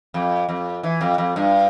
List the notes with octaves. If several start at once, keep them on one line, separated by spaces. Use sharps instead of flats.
F2
F2
E3
F2
F2
G2